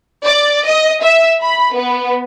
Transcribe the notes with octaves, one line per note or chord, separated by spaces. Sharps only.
D5
D#5
E5
B5
B3